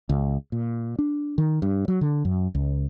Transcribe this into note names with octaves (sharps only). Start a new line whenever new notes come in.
C#2
A#2
D4
D#3
G2
F#3
D3
F#2
C#2